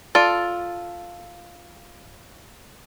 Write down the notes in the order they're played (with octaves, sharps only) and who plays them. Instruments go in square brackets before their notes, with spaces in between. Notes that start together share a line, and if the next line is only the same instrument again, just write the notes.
[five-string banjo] F4 A4 D5